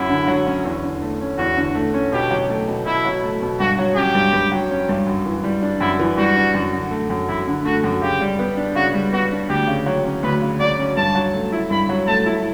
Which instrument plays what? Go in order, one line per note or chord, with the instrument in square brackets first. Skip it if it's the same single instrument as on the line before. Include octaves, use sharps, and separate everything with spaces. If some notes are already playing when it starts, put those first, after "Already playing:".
Already playing: [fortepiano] F#2 F#3 C#4 [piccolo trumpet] E4
[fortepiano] D3
F#3
C#4
E2
D3
A3
C#4
[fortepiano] E2 [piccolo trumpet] F#4
[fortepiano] D3
A3
C#4
[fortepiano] B2 [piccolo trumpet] G4
[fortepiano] F#3
A3
B2
[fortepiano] B2 [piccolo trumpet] E4
[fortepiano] F#3
A3
B2
[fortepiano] G2 [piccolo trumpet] F#4
[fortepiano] F#3
[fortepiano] C#4 [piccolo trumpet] G4
[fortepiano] G2
G2
F#3
C#4
G2
F#2
E3
G3
D4
[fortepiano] F#2 [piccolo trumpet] E4
[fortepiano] E3
[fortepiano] G3 [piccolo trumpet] F#4
[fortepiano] D4
F#2
D3
A3
F#2
[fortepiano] F#2 [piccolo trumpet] E4
[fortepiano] D3
[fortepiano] A3 [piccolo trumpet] F#4
[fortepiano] F#2
[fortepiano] C#3 [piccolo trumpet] G4
[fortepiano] G3
B3
D4
[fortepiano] C#3 [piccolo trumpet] F#4
[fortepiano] G3
[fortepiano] B3 [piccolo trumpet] F#4
[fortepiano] D4
[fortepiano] D2 [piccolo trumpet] G4
[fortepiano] C#3
F#3
C#4
[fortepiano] D2 [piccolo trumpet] B4
[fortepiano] C#3
[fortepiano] F#3 [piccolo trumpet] D5
[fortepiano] C#4
[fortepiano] G2 [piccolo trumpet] A5
[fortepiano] F#3
A3
E4
[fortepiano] G2 [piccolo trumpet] B5
[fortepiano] F#3
[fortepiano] A3 [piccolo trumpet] A5
[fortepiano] E4